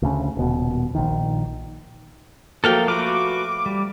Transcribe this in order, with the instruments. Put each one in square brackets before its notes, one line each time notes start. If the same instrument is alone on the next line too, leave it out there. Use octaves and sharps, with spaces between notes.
[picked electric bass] D2 C#3
D#1 B2
A#1 D#3
[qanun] F3 F#3 A3 [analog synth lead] A#3 [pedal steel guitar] A4 F5 G5
[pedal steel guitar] F#4 B4 F5 [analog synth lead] D6
[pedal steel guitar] G3